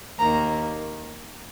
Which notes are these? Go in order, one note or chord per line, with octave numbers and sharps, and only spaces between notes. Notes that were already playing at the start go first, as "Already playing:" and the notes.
D#2 D#3 A#3 A#5